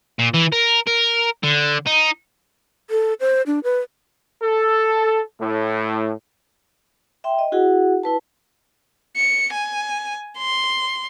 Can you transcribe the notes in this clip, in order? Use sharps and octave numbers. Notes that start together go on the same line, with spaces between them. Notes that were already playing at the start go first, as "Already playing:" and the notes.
A#2
E3
A#4
A#4
D3
D#4
A4
C5
D4
B4
A4
A2
E5 G5 C6
D#5
E4 F#4 G#4 F#5
E4 B4 A5
C#7
G#5
C6